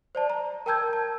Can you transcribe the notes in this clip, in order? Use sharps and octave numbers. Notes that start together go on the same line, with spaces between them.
C5 D5 A5
A#5
A#4 G5 A5 E6 G6 G#6
A5